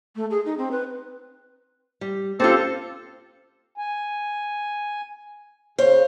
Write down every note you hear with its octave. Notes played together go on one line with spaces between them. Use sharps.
A3
G#4
D#4
C4
B4
G3
C4 C#4 F4 G4 A4
G#5
C#3 C5 C#5